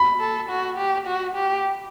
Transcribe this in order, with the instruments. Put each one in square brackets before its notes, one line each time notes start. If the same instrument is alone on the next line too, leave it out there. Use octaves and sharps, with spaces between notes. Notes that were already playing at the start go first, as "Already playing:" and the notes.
Already playing: [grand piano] B5
[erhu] A4
F#4
G4
F#4
G4